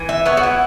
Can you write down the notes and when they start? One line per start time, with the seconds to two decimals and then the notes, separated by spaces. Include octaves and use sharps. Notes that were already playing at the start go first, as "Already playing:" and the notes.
Already playing: E3
0.09 E5
0.26 B3 C#5
0.37 F#4
0.43 E4